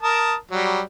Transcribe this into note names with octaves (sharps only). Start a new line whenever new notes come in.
A#4 A5 D#6
F#3 G3